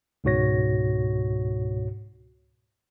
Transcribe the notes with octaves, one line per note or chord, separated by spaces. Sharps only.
C#2 G#2 B2 F#4 C#5 A#6